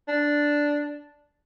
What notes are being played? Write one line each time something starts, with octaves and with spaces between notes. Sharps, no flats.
D4